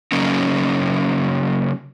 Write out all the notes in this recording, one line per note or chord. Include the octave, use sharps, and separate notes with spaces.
C#3 F#3 A#3 C#4 D#4